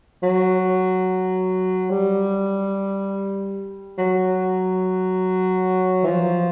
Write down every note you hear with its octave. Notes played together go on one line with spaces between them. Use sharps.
F#3
G3
F#3
E3
F3